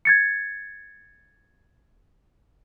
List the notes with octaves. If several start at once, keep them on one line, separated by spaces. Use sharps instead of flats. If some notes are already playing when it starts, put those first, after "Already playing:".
G#6 A6 C#7